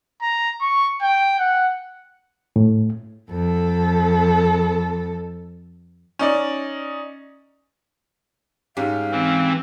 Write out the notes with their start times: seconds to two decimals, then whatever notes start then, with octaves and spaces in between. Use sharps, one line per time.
0.21 A#5
0.61 C#6
1.02 G5
1.38 F#5
2.56 A2
3.30 F2 A4
6.19 C#4 D#4 D5
8.77 G#2 C#4 G4 F5
9.12 E3 C4